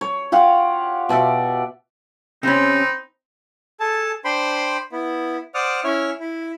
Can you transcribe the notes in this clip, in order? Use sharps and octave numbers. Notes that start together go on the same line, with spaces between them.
C#5
F4 G4 F5 F#5
B2 D5 E5 F#5
C3 C4 C#4 D#4 B5
G#4 A4 A5
D4 C5 G5 B5 C6
B3 E4
C5 D5 F#5 D6 D#6 F6
C#4 E4 C#5 E5 F6
E4